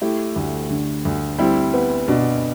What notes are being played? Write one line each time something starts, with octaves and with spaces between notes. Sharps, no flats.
A3 E4 G4
D2
D3
D2
G3 C4 E4
B3
B2 D4